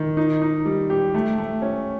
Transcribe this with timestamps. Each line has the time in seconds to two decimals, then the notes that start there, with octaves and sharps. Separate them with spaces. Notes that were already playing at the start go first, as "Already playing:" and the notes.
Already playing: D#3
0.17 D#4
0.42 D#4
0.65 G3
0.90 G4
1.14 A3
1.38 A3
1.62 C#4